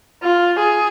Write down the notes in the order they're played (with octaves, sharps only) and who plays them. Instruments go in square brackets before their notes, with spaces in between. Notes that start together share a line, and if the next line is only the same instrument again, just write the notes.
[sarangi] F4
G#4